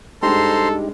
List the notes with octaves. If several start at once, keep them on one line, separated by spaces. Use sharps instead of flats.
G2 G#3 D#4 G4 A4 C5 A#5 C6